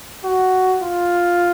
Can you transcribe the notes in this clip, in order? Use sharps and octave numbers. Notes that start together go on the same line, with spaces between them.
F#4
F4